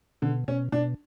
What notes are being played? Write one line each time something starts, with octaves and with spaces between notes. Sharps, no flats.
B2 D3
B2 C#4
B2 D4